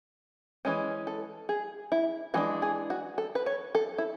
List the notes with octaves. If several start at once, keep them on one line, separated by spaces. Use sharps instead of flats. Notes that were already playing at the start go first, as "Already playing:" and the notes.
E3 G#3 C#4
A4
G#4
E4
E3 G#3 D4 F#4
G#4
F#4
A4
B4
C#5
A4
E4